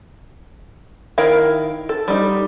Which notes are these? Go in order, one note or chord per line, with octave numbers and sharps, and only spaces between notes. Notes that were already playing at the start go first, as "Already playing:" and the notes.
D#3 E4 A#4 F5
A4
G3 D#4